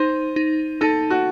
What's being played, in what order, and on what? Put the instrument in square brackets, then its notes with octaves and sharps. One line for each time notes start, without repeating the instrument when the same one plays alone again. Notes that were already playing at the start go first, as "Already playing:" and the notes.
Already playing: [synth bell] D#4 [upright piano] C5
[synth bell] D#4
[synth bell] D#4 [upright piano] A4
[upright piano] F#4